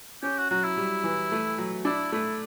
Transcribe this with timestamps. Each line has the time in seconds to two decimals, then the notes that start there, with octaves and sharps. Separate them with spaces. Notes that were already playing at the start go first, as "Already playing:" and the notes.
0.23 C#4 G4
0.37 F#4
0.50 F#3 F#4
0.63 E4
0.77 G3
1.04 E3
1.32 A3
1.58 F#3
1.85 D4 E4
2.12 A3 E4